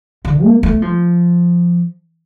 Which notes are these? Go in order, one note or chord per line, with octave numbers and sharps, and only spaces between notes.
D3
A#3
A3
F3